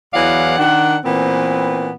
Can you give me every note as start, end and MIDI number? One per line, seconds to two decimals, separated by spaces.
0.13 0.55 40
0.13 0.55 52
0.13 0.55 54
0.13 0.55 74
0.13 0.55 77
0.13 0.55 78
0.59 0.95 51
0.59 0.95 62
0.59 0.95 78
1.05 1.90 46
1.05 1.90 52
1.05 1.90 59
1.05 1.90 60